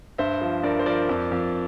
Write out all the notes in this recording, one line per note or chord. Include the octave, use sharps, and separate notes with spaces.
G2 C5 E5
F3
G2 A#4 D5
C5
F3 A#4 D5
F2
F2